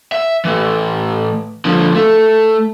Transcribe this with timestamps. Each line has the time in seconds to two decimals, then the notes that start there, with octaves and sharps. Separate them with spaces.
0.12 E5
0.45 A2 E3
1.65 D3 F3
1.95 A3